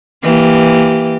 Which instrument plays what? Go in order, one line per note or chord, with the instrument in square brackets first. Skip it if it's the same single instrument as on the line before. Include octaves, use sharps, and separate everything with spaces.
[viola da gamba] E3 A#3 G4